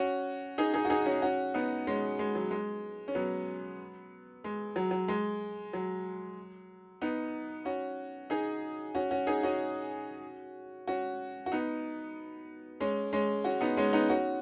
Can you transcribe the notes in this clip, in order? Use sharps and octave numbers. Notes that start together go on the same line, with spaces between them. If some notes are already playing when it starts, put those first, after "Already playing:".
Already playing: C#4 F#4
D#4 G#4
D#4 G#4
F#4
D#4 G#4
C#4 F#4
C#4 F#4
B3 D#4
G#3 C#4
G#3
F#3
G#3
C#4
F#3 B3
G#3
F#3
F#3
G#3
F#3
B3 D#4
C#4 F#4
D#4 G#4
C#4 F#4
C#4 F#4
D#4 G#4
C#4 F#4
C#4 F#4
F#4
B3 D#4
G#3 C#4
G#3 C#4
C#4 F#4
B3 D#4
G#3 C#4
B3 D#4
C#4 F#4